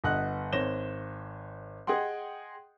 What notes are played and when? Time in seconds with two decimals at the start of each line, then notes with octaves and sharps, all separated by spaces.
0.04 G1 D#5 F#5 F#6
0.53 G#1 C5 C#5 A#6 E7 G7
1.87 G#4 D#5 F#5 G5 C6